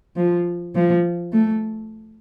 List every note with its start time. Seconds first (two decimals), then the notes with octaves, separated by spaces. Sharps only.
0.16 F3
0.75 F3
1.32 A3